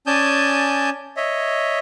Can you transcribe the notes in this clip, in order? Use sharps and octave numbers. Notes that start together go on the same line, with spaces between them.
C#4 D5 G#5 A5 D#6 G6
C#5 D#5 E5